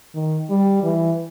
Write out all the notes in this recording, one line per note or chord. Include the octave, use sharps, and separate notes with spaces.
D#3
G3
E3